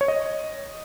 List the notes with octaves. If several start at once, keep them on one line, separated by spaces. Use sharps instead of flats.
C#5
D#5